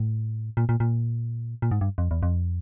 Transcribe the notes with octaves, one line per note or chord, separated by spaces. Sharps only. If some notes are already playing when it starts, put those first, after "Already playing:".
Already playing: A2
A#2
A#2
A#2
A#2
G#2
G2
F2
E2
F2